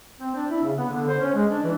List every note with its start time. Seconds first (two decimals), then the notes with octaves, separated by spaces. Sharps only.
0.20 C4
0.36 D4
0.50 E4
0.63 C#3
0.77 B3
0.90 D3
1.08 C5
1.20 C#4
1.34 G#3
1.50 D4
1.64 E3